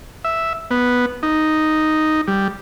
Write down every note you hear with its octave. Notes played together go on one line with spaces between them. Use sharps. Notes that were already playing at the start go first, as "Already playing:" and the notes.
E5
B3
D#4
G3